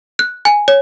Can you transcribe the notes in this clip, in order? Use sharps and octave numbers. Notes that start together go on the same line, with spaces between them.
F#6
G#5
C#5